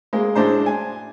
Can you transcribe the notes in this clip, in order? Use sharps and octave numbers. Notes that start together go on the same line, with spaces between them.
G#3 A#3
A2 G#3 D4 C5
G#5